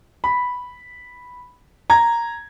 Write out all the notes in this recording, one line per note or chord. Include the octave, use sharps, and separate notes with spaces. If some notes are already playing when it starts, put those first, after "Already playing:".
B5
A#5 G#6